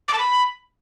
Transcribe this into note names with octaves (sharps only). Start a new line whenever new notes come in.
D6
A5
B5